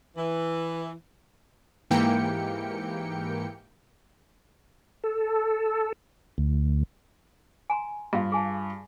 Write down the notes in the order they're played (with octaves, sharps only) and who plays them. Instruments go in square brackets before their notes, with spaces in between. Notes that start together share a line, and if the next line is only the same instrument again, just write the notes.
[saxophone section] E3
[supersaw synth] G#2 E3 A#3 G4 G5 C#7
[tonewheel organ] A4
D2
[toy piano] G#5 A#5 C6
[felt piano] G2 F4 [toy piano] F5 B5
[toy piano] G#4 G#5 A5